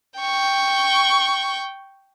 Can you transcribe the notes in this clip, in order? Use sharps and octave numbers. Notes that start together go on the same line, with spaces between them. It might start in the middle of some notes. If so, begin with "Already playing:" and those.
G5 C#6